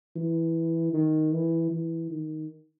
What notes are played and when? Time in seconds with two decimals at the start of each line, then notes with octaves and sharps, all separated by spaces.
0.16 E3
0.93 D#3
1.32 E3
1.71 E3
2.11 D#3